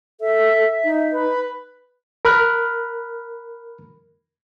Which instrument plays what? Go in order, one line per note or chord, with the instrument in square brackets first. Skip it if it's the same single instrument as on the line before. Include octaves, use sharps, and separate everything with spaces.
[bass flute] A4 [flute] E5
[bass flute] D#4
[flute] B4
[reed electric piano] A#4 B5 F6 F#6